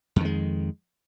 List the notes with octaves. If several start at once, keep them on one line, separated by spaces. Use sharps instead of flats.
F2 D#3 G#3